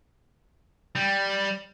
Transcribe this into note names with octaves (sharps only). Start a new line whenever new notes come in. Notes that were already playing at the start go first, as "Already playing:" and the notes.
G3